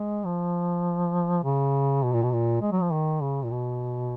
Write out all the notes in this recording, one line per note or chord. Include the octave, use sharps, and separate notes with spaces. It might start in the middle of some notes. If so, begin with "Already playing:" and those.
Already playing: G#3
F3
C#3
B2
A#2
B2
A#2
G#3
F#3
F3
D#3
C#3
A#2
B2